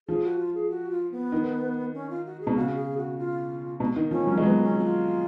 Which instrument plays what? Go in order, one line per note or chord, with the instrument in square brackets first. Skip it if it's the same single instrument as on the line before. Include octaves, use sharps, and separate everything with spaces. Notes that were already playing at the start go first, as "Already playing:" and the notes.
[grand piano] F3 [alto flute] G#4
[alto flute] F#4
F4
G#4
F#4
F4
B3
[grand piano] D#3
[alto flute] C#4
F4
F#4
G#4
[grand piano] B2
[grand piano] C#3 [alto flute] F#4
[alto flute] G#4
F#4
F4
[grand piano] B2
D#3
[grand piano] F3 [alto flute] C#4
[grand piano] F#3
G#3
[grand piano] F#3 [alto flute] B3
[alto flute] C#4
F#4
F4